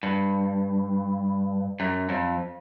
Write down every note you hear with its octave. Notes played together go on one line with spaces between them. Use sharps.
G2
F#2
F2